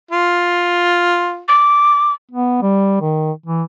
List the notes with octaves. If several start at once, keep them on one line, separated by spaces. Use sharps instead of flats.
F4
D6
B3
G3
D#3
E3